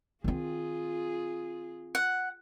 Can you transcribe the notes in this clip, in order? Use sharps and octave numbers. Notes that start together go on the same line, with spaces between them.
D#3 C4 F4 G#4
F#5